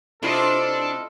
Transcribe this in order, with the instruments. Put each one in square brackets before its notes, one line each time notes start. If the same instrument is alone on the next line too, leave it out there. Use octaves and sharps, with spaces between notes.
[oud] C3 A3 [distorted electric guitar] D4 D5 [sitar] E4 F4 D#5 [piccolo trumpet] A4